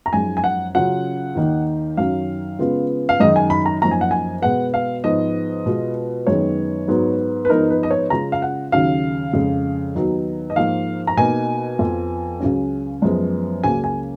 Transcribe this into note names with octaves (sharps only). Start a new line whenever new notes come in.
A#5
F#2 F3 G#3 D#4 G#5
G#5
F#5
C#3 F#3 C#4 F4 F#5
D#2 D#3 A#3 D#4
F#2 D#3 F#3 C#4 F5
C#3 G#3 B3 F4
F5
F#2 D#3 G#3 D#4 D#5
G#5
B5
A#5
F#2 F3 A#3 D#4 A#5
G#5
F#5
G#5
B2 G#3 B3 F#5
F5
G#2 F3 B3 D#5
B2 G#3 B3 F4
F#2 D#3 G#3 B3 D#4 C#5
G#2 F#3 B3
B4
G#2 F3 B3 D#4 A#4
B4
D#5
C#5
C#3 G#3 C#4 F4 A#5
F5
F#5
D#2 C#3 F#3 F5
F2 C#3 G#3
D#2 D#3 F#3 B3 D#4
D#5
G#2 F3 A#3 F5
A#5
B2 A#3 D#4 G#5
F2 F3 B3 F4
C#2 C#3 F#3 C#4
F#2 F3 G#3 B3
C#2 C#3 F#3 A#3 C#4 G#5
G#5